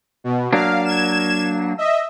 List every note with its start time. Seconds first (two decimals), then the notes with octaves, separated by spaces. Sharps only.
0.24 B2
0.53 F#3 A#3 D4 F5
0.84 G#6 E7
1.78 D#5 E5